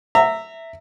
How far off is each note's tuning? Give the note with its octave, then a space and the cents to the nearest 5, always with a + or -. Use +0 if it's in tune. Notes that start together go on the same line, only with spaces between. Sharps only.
E5 +0 A#5 -25